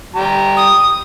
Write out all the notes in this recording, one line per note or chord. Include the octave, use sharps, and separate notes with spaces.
G3 G4 A#5
D#6